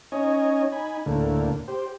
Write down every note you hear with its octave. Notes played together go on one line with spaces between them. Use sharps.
C#4 D#4 C#5 D#5 G#5
D#4 G#5 B5
D2 A2 D3 A#3
G4 C5